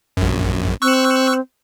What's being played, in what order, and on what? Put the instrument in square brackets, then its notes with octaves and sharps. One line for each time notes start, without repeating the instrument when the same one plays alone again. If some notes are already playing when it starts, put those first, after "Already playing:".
[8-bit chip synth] A#1 F#2
[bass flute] C4 [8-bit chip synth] C#6 E6 F#6